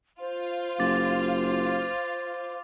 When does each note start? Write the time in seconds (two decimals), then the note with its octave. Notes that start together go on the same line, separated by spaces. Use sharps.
0.20 F4 C5
0.79 F#1 D6 A6